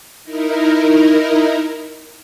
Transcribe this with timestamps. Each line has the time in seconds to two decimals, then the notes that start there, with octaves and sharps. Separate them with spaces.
0.24 D#4 E4 A#4